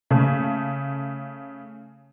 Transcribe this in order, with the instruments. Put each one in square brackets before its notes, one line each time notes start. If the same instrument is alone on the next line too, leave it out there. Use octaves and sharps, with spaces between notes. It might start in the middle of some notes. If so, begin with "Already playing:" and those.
[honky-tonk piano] C#3 A3